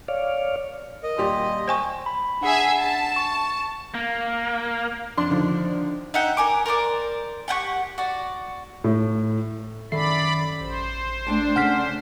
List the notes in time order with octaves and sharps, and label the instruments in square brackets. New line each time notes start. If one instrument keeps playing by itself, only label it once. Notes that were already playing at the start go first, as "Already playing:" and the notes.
[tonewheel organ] C#5 D5 F5
[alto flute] A#4 [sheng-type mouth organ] D#5
[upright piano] D#1 G4 D5 [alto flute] C6
[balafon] C5 G#5 C#6 [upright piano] G5
[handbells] B5
[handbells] D4 F#5 C7 [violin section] G#4 E5 G#5
[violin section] A5
[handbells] C#6
[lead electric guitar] A#3
[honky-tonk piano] F2 C6 [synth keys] D4
[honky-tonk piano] D3 D#3 F3
[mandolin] D#4 E5 F#5 G5
A#4 G#5 D6
A#4 C5 D5 D6
G4 F#5 G5 C#6
F#4 D5
[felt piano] A2
[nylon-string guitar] F#2 A4 [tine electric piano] D#3 E5 C7 [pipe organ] D5 B5
[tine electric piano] A1 [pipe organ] C5
[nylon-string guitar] A3 G5 A5 [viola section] D4
[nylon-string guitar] C#3 A3 [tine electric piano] F#5 F6 B6